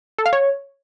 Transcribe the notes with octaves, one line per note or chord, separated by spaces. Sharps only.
A4
F5
C#5